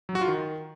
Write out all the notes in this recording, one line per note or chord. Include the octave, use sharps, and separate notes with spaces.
F#3
F#4
F4
D#3